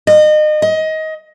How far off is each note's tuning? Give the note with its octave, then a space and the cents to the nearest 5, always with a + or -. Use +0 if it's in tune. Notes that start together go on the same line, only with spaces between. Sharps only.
D#5 -30
D#5 +20